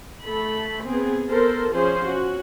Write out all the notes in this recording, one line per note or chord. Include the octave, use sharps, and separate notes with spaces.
A3 A4 B5
B3 C4 G#4
B3 A4 A#4 C5
F3 C#4 G#4 C5
C#4 F#4